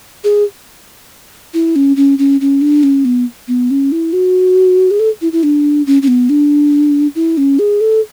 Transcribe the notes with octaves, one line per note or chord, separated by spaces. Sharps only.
G#4
E4
C#4
C#4
C#4
C#4
D4
C#4
B3
B3
C#4
E4
F#4
G#4
A4
E4
E4
D4
C#4
C#4
B3
D4
E4
C#4
G#4
A4